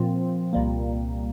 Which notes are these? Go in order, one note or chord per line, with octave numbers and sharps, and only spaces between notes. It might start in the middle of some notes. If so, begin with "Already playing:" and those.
Already playing: A#2 F3 C4
C2 A#2 G3 A#3